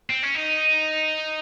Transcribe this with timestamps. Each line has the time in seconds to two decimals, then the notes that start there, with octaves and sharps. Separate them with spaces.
0.10 C4
0.23 C#4
0.35 D#4